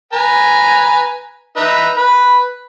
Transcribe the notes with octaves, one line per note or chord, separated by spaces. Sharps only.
B4 G#5 A#5
D#4 B4 E5
B4 B5